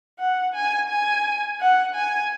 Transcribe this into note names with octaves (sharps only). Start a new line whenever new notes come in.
F#5
G#5
G#5
F#5
G#5